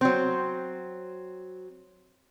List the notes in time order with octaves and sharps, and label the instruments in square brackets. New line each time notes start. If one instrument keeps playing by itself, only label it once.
[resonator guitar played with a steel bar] F#3 C4